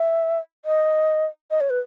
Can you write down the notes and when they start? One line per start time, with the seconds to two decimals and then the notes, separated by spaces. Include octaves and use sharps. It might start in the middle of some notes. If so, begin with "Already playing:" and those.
Already playing: E5
0.65 D#5
1.51 D#5
1.61 C#5
1.70 B4